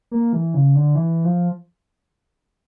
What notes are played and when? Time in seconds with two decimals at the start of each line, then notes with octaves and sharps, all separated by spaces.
0.11 A#3
0.33 E3
0.54 C#3
0.75 D3
0.95 E3
1.24 F3